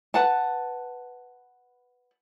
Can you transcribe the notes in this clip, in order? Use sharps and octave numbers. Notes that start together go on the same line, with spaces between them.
B4 F#5 A5